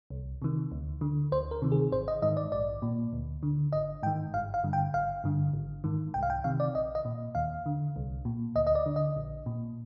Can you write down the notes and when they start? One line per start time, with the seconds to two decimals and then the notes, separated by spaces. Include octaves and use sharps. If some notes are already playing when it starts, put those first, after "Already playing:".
0.10 C2
0.42 C3 D#3
0.71 D2
1.01 D3
1.32 D2 C5
1.51 A#4
1.62 C3 D#3
1.72 G#4
1.92 G#1 C5
2.08 D#5
2.22 G#2 D#3 D#5
2.37 D5
2.52 A#1 D5
2.82 A#2
3.13 D2
3.43 D3
3.72 G#1 D#5
4.03 G#2 D#3 G5
4.34 G1 F5
4.54 F5
4.64 G2 D3
4.73 G5
4.94 G#1 F5
5.24 G2 D3
5.54 G#1
5.84 G#2 D#3
6.14 C2 G5
6.23 F5
6.30 G5
6.44 C3 D#3 F5
6.60 D5
6.75 A#1 D#5
6.95 D#5
7.05 A#2
7.35 D#2 F5
7.66 D3
7.96 C2
8.25 A#2
8.55 D2 D#5
8.67 D#5
8.75 D5
8.86 D3
8.96 D#5
9.16 A#1
9.46 A#2